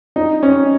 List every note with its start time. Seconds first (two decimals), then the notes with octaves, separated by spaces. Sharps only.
0.16 D#4
0.43 C#4